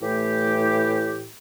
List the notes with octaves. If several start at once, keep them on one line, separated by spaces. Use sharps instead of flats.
A2 E3 A3 E4 G4